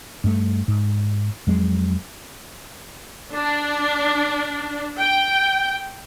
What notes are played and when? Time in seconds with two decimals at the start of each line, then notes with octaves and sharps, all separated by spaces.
0.24 G2 A3
0.68 G#2
1.47 F2 F#3 G#3
3.31 D4
5.00 G5